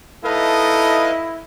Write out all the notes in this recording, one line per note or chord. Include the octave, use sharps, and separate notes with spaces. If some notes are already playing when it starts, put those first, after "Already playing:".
A3 D#4 E4 A4 B4 D#5 F5